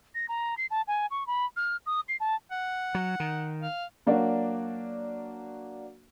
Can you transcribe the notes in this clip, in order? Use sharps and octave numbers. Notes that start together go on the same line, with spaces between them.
A#6
A#5
C7
A5
G#5
C#6
B5
F6
D#6
C7
A5
F#5
F#3
D#3
F5
F#3 A#3 D4 F#4 D5